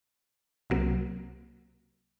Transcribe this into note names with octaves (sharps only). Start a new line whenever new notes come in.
C2 C3 F#3 A#3